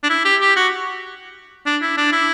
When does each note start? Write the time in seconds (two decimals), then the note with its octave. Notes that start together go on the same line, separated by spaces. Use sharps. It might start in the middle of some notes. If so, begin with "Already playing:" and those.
0.03 D4
0.09 E4
0.25 G4
0.41 G4
0.56 F#4
1.66 D4
1.82 E4
1.97 D4
2.12 E4